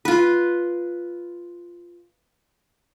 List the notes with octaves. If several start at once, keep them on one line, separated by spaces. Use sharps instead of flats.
F4 B4